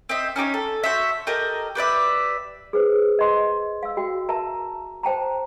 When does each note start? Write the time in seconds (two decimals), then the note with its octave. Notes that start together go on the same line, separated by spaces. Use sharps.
0.09 C4 D#5 E5
0.36 C#4 D#4 G4 C#5
0.54 A4
0.84 F#4 C5 C#5 E5
1.27 G4 A4 A#4 D#5
1.75 G4 B4 D5 E5
2.73 G#4 B4 C5
3.19 D#5 C6
3.83 F5 E6
3.97 F#4 G5
4.29 A#4 E5 A5 A#5
5.03 C5 G5 A5 A#5